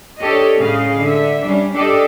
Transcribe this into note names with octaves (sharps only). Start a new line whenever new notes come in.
D4 G4 A4 C#5 D#5
A2 C#3 G#3 G#4 D#5 F5
D3 E5
G3 C#4 D4
D4 G4 A4 D5 D#5